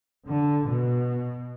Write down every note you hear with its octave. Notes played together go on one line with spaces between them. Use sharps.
D3
B2